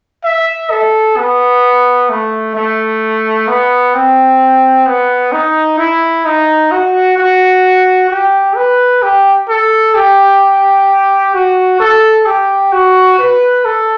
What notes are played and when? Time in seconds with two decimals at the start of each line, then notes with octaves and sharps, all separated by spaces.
0.24 E5
0.71 A4
1.17 B3
2.10 A3
2.55 A3
3.48 B3
3.94 C4
4.86 B3
5.32 D#4
5.78 E4
6.25 D#4
6.72 F#4
7.18 F#4
8.10 G4
8.56 B4
9.03 G4
9.49 A4
9.95 G4
11.34 F#4
11.80 A4
12.26 G4
12.72 F#4
13.19 B4
13.65 A4